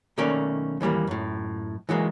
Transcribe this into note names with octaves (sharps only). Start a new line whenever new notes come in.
B1 D#3 A3 A#3 C#4 D5
D#2 E3 G3 A#3
F#2 A2
E3 F#3 G#3 A#3